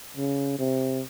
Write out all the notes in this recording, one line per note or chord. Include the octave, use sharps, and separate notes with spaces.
C#3
C3